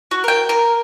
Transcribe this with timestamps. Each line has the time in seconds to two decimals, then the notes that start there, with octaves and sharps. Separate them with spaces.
0.11 F#4
0.24 A#4 G5
0.49 A#4